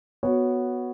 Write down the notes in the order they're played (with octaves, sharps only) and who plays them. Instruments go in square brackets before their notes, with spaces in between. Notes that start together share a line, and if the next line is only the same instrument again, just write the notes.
[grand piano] B3 F#4 C#5